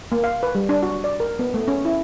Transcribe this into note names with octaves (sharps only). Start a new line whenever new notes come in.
A#3
F5
B4
G3
D4
F#4
D5
A#4
B3
A3
C#4
E4